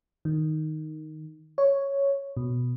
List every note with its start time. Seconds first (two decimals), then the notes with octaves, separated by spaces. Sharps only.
0.25 D#3
1.58 C#5
2.37 B2